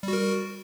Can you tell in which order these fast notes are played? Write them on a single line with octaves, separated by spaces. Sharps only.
G3 F#4 A#4